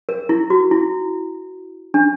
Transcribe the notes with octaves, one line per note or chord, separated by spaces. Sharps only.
A#4
E4
F#4
E4
D4